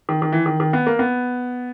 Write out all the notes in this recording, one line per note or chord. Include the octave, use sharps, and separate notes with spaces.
D#3
D#3
E3
D#3
D#3
B3
A#3
B3